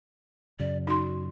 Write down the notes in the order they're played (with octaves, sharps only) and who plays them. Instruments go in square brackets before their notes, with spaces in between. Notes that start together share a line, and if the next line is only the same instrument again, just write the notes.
[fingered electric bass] F#2 C#3 [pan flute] D5
[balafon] D#4 C6 [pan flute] F#4